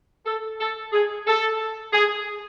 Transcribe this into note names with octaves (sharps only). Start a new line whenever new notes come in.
A4
A4
G#4
A4
G#4